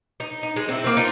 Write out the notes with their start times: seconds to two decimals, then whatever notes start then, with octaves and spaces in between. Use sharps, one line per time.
0.20 D#4
0.43 D#4
0.56 G#3
0.68 C4 E4
0.84 A#3 C4
0.96 D4 D#4 F4